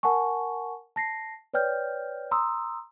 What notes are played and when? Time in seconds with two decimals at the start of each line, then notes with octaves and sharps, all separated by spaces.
0.03 A#4 F#5 G#5 A5 C#6
0.96 A5 A#6 C7
1.54 B4 C#5 D5 G5 F6 G6
2.31 A#5 C6 D#6 E6